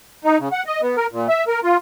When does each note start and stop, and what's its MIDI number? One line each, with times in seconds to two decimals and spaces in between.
0.25 0.38 63
0.40 0.49 49
0.52 0.63 78
0.66 0.81 75
0.82 0.96 59
0.97 1.07 70
1.12 1.28 46
1.29 1.44 76
1.48 1.60 70
1.64 1.77 65